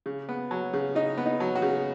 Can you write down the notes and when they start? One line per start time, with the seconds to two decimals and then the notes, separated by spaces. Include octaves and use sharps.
0.06 C#3
0.29 B3
0.51 F#3
0.73 C#3
0.95 C#3 D#4
1.18 B3
1.26 D#4
1.40 F#3
1.55 F#4
1.62 C#3